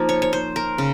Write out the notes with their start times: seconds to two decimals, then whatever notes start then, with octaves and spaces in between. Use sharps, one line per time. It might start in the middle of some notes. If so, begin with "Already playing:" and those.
Already playing: F3 A#3 D#4
0.09 C#5
0.22 C#5
0.33 C5
0.56 A#4
0.78 C#3